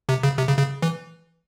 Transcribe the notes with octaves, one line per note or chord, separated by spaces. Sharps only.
C3
C#3
C3
C#3
C#3
E3